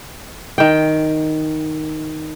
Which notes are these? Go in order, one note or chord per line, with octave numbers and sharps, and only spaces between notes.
D#3 G5